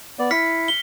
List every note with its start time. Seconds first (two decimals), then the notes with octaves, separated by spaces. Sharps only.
0.19 B3 D5
0.31 E4 F6 B6 C#7
0.68 G7